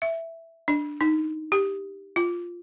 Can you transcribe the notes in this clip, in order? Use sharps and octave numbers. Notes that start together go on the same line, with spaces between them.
E5
D4
D#4
G4
F4